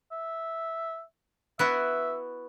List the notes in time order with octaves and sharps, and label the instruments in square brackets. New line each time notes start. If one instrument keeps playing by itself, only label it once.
[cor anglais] E5
[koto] B3 E4 F#4 [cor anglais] E5